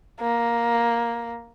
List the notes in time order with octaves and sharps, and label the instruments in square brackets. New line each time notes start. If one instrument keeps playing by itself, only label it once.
[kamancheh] A#3